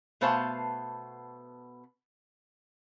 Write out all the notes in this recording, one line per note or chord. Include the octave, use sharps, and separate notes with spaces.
B2 A3 B3 C5 F5 A5